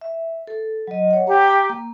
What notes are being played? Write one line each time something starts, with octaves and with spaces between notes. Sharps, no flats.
E5
A4
F#3 D#5
C#5 F#5
G4 A#5
A#3